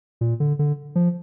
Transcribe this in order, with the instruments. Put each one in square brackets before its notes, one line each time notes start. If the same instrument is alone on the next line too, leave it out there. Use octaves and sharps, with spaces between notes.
[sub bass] A#2
D3
D3
F3